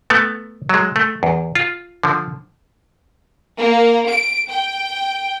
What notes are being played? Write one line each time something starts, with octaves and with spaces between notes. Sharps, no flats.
A3 B3
F#3 G#3
A3
E2
F4
D3 F3
A#3
D7
G5